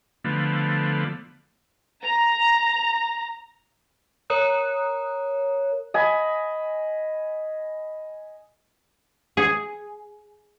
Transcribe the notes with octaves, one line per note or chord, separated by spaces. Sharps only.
D3 F3 A3 B3
A#5
A#4 C#5 A#5 D#6 F#6
D#5 G#5 B5
G#4